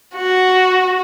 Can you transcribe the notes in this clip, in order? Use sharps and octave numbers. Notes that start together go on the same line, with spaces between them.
F#4